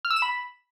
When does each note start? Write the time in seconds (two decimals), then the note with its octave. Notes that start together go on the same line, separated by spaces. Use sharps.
0.05 F6
0.10 E6
0.16 E7
0.22 B5